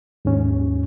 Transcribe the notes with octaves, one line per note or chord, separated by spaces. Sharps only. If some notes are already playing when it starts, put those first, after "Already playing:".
D#2 G#2 C#4